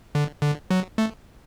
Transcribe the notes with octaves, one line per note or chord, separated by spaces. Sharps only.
D3
D3
F#3
A3